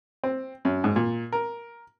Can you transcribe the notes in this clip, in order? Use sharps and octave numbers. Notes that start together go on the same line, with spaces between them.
C4
F#2
G#2
A#2
A#4